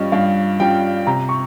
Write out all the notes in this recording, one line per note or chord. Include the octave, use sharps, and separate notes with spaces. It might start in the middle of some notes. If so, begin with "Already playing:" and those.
Already playing: G2 G3 C#4 F4 D#5 C#6
G2 F5
G3 C#4 F4 G5
C3 A#5
C#6